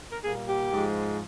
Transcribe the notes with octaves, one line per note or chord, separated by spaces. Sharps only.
A#4
A#2 G3 A#3 G#4
G4
G#2 F3 G#3